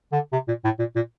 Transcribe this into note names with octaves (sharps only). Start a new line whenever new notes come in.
D3
C3
A#2
A2
A#2
A#2